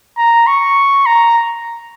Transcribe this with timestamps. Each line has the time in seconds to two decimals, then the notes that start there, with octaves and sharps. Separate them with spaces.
0.18 A#5
0.47 C#6
1.06 A#5